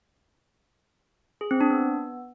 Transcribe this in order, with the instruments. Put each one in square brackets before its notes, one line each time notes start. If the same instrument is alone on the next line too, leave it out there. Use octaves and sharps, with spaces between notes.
[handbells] G#4
C4
D4
B3